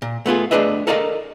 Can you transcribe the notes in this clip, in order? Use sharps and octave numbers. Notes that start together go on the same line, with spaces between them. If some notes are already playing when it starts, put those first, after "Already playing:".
A#2
A3 B3 F4 G#4
A3 D4 G#4 B4 D#5 E5
A4 A#4 D5 D#5 F5 A#5